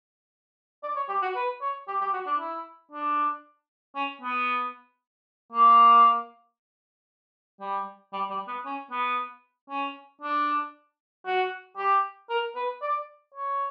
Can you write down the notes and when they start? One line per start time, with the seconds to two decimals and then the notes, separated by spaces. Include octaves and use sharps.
0.83 D5
0.96 C#5
1.09 G4
1.22 F#4
1.36 B4
1.62 C#5
1.88 G4
2.01 G4
2.13 F#4
2.27 D4
2.39 E4
2.92 D4
3.96 C#4
4.21 B3
5.52 A#3
7.61 G3
8.13 G3
8.30 G3
8.48 B3
8.65 C#4
8.91 B3
9.69 C#4
10.22 D4
11.26 F#4
11.77 G4
12.30 A#4
12.56 B4
12.82 D5
13.35 C#5